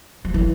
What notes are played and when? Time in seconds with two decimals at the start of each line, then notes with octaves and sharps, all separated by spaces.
0.25 F3
0.34 E3